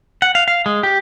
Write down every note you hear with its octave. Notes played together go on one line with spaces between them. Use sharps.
F#5
F5
F5
G#3
G4